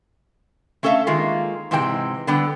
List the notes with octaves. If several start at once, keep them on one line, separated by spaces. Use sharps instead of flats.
A3 C#4 A4 C#5 E5 F5
D#3 G#3 A#3 F4
G#2 C3 E3 G#3 G4 G5
D3 G3 B3 G5